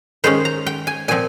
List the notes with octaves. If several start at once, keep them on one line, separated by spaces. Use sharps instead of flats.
D#3 G#3 C#4 C5
A#5
G5
G#5
A#2 F3 C4 G#5